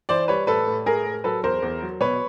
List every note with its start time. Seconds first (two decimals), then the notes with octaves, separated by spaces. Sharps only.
0.09 E3 C5 D5
0.28 G3 B4 C#5
0.47 A2 A4 B4
0.67 A2
0.86 A2 G#4 A#4
1.06 A2
1.24 F#3 A4 B4
1.44 E2 A#4 C5
1.62 E2
1.82 F#3
2.00 B2 B4 C#5